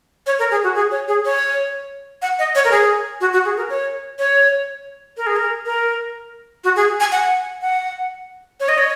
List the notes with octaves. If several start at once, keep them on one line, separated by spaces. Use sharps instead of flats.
C#5
A#4
G#4
F#4
G#4
C#5
G#4
C#5
F#5
D#5
C#5
A#4
G#4
F#4
F#4
G#4
A#4
C#5
C#5
A#4
G#4
A#4
A#4
F#4
G#4
G#5
F#5
F#5
C#5
D#5
C#5